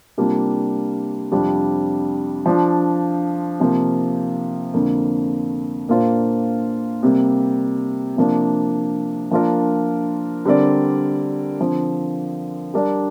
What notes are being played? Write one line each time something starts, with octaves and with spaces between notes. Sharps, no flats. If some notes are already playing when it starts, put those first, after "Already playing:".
C3 G3 A#3 D4 F4
F2 C3 G3 D4 F4
F3 D4 F4
C3 F3 A#3
F2 D3 A#3
A#2 A#3 D4 F4 C5
C3 G3 A#3
C3 F3 A#3 D4
F3 A#3 D4 F4 A#4
D3 G3 C4 A#4 D5
D3 F3 C4
G3 D4 A#4 D5